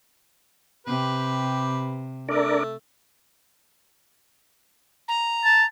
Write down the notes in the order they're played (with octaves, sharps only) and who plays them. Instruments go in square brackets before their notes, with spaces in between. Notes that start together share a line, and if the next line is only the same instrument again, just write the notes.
[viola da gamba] C3 [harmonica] G4 B4
[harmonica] A3 [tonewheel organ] D4 A#4 D5
[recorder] A#5
[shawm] A5